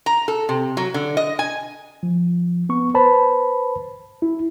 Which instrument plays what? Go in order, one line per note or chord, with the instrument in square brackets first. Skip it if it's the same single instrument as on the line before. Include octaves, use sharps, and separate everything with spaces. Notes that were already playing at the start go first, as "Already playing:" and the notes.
[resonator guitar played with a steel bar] A#5
A4
C3
F#3
D3
D#5
G#5
[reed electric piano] F3
B3 C#6
B4 C5 A5 B5
E4